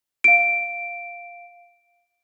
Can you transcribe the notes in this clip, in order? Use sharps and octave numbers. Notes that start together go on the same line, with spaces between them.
F5 D7